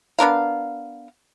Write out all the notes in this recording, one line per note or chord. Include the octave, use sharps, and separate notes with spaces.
B3 D4 A#4 F5